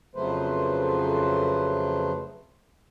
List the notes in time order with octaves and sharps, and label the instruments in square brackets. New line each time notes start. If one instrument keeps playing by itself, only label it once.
[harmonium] F2 C#3 F#3 A3 B4 C5